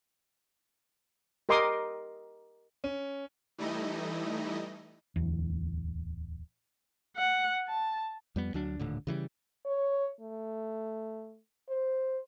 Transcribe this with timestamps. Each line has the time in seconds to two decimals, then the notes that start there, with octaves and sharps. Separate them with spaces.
1.49 G4 A#4 D#5 C6 D6 D#6
2.84 C#4
3.58 E3 G3 A3 D#4 E4 D#5
5.16 D1 E2
7.17 F#5
7.69 A5
8.36 F2 G3 B3
8.54 D2 F#3 D4
8.79 D#1 A2 D3
9.07 C#3 E3 F#3 G3
9.66 C#5
10.21 A3
11.69 C5